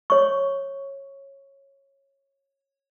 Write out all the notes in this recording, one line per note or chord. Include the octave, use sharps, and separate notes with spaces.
C#5 C#6